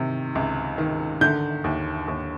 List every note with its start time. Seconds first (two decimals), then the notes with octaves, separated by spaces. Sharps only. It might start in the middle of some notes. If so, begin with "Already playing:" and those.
Already playing: C3 D#3
0.35 C#2
0.78 D#3
1.21 D3 G6
1.64 D#2
2.08 D#2